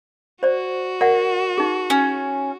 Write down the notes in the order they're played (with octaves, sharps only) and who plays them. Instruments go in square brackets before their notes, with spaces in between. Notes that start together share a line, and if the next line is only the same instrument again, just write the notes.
[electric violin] F#4 [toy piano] C5 D5
[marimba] A#4 [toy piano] D5 F#5
[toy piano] D#4 G#4
[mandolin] C#4